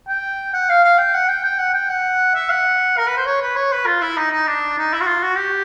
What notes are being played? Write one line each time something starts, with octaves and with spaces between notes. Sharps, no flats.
G5
F#5
F5
F5
G5
F#5
G5
G5
F#5
G5
F#5
E5
F#5
A#4
B4
C5
C#5
B4
C#5
B4
F4
E4
D#4
D#4
D4
D#4
E4
F#4
F4
F#4
G4